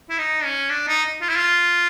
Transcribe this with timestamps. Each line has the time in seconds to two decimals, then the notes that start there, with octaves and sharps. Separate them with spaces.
0.10 E4
0.18 D#4
0.44 C#4
0.70 D4
0.88 D#4
1.22 F4
1.29 E4
1.37 F4